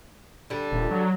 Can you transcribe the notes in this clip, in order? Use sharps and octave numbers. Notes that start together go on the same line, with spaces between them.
D3 G3
D#1
F#3